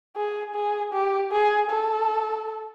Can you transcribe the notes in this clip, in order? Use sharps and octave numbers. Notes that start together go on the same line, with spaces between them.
G#4
G#4
G4
G#4
A4